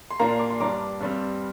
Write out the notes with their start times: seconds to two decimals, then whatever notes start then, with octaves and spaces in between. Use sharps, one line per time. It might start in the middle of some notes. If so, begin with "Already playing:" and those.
0.11 C6
0.20 A#2 A#3 D4 F5 A#5
0.39 D6
0.50 C6
0.60 G2 G3 D4 A#5 D6
1.00 G2 G3 C4